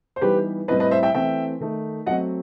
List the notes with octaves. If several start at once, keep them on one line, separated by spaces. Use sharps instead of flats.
C5
E3 G3 B3 D#4 G4 B4
A2 G3 C4 E4 B4 D#5
B4 D#5
C5 E5
E5 G5
E3 A3 C4 E5 G5
D#3 A3 D#4
F#3 A3 C4 D#5 F#5